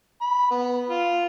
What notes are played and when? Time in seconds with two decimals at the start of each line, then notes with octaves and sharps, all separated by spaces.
0.21 B5
0.51 B3
0.90 F4